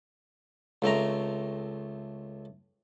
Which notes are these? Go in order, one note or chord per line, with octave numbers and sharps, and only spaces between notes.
C#2 A3 C4 A#5